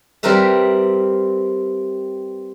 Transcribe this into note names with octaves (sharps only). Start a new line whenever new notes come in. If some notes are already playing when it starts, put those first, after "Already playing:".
G3 C4 G4 A#4 B4 E5